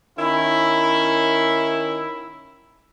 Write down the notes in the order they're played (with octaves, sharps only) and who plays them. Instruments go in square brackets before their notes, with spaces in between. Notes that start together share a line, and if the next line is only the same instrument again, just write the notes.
[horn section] D#3 C#4 E4